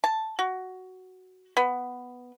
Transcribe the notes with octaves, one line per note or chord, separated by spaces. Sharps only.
A5
F#4
B3